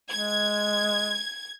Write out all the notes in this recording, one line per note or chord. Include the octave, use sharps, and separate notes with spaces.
G#3 G#6